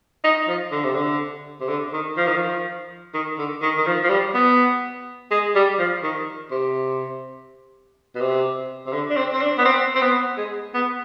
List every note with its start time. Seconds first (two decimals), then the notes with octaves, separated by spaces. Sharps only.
0.24 D#4
0.48 F3
0.72 D3
0.84 C3
0.95 D3
1.60 C3
1.69 D3
1.93 D#3
2.17 F3
2.27 D#3
2.36 F3
3.14 D#3
3.38 D3
3.62 D#3
3.78 D#3
3.86 F3
4.04 F3
4.10 G3
4.34 B3
5.31 G#3
5.56 G3
5.79 F3
6.03 D#3
6.51 C3
8.15 B2
8.21 C3
8.87 C3
8.93 D3
9.10 D4
9.17 C4
9.33 C4
9.42 D4
9.58 B3
9.65 C4
9.96 C4
10.02 B3
10.38 G#3
10.74 B3